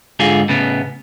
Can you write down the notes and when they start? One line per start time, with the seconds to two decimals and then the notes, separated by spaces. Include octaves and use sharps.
0.19 G#2 D3 F4 G#4
0.49 A2 C#3 B3